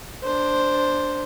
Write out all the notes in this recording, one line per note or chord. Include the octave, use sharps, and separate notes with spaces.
D4 C5